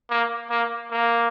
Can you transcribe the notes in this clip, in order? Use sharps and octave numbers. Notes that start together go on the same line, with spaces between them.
A#3
A#3
A#3